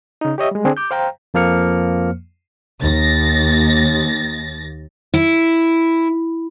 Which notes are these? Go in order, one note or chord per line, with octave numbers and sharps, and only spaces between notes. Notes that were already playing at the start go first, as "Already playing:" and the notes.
C#3 D#4
G4 C#5 D#5 E5
G3 G#3
D3 C4 D4 G#4
D6 G6
C5 F5 G5 A#5
F2 F3 A#3 F6 C#7
D#2 A6 A#6
E4